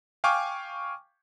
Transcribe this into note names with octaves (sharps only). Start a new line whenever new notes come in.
F5 G5 G#5 C#6 D6 F6